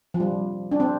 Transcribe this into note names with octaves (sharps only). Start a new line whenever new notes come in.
F3
G3
D4
C4